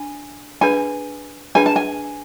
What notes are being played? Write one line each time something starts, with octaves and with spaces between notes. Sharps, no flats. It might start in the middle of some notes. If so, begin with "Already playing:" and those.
Already playing: D4 G#5
D4 G#4 B4 G#5
D4 G#4 B4 G#5
A5
G#5